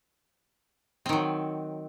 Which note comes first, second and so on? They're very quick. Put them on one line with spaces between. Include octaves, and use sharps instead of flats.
C4 D#3 F#3